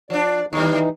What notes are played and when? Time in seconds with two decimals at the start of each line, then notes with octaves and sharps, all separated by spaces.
0.10 F3 D4 D5
0.53 D#2 E3 G3 D#4